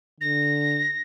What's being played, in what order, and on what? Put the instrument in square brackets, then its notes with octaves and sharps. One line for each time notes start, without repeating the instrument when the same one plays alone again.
[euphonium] D3 [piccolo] A#6